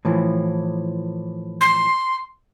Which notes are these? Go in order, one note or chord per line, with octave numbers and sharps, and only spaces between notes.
A2 E3 F3
C6